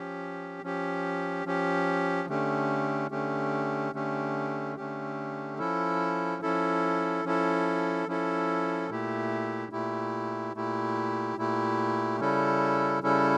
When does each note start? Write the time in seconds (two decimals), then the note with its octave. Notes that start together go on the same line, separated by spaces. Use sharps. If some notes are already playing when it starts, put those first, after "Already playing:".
Already playing: F3 C#4 G4
0.63 F3 C#4 G4
1.45 F3 C#4 G4
2.29 D3 A3 C#4 G4
3.11 D3 A3 C#4 G4
3.93 D3 A3 C#4 G4
4.76 D3 A3 C#4 G4
5.58 F3 C#4 E4 A4
6.42 F3 C#4 E4 A4
7.24 F3 C#4 E4 A4
8.07 F3 C#4 E4 A4
8.89 A#2 A3 E4 G4
9.72 A#2 A3 E4 G4
10.55 A#2 A3 E4 G4
11.37 A#2 A3 E4 G4
12.20 C#3 G3 C#4 E4 A4
13.03 C#3 G3 C#4 E4 A4